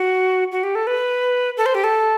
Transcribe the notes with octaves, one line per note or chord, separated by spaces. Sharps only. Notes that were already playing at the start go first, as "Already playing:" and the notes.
Already playing: F#4
F#4
G4
A4
B4
A4
C5
G4
A4